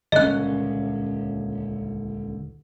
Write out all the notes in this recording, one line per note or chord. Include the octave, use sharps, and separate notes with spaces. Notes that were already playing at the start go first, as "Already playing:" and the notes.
D#1 C#2 D3 C#4 D#5 F#6